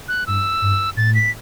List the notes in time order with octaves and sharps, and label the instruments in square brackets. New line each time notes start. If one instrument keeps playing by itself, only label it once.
[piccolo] F#6
[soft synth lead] G2 [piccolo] E6
[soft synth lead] G2
[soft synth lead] A2 [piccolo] A6
[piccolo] B6